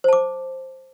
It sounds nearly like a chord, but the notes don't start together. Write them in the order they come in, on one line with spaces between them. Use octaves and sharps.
C5 A5 D6